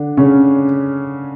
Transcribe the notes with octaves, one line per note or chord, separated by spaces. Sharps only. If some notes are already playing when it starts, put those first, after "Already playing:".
Already playing: D3 D4
C#3 C#4